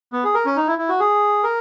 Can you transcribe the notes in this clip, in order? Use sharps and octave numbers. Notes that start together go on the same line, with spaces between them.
B3
G#4
A#4
C#4
D#4
E4
E4
F#4
G#4
A#4